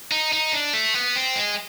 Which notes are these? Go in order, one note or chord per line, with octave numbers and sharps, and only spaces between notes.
D#4
D#4
D4
A3
B3
C4
G#3